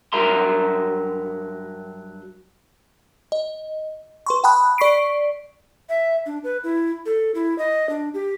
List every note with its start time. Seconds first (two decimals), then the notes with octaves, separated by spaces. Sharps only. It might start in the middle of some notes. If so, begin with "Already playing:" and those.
0.13 G2 F#3 A#4 E5 A#5 C6
3.32 D#5
4.26 B4 C6 C#6
4.44 F#5 G5 A5 B5 D#6 F#6
4.78 D5 C#6 B6 C7 D7
5.89 E5
6.26 D4
6.44 B4
6.64 E4
7.06 A4
7.35 E4
7.58 D#5
7.89 D4
8.14 G4